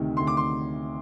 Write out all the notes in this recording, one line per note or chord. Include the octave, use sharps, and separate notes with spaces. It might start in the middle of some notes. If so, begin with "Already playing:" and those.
Already playing: D2 C3 D#3
D2 C6
D6
C6